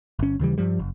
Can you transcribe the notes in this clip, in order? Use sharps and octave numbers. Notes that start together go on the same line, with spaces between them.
G1 C#4
D#2 C#3 E3 G3
G2 F3 G3
F#1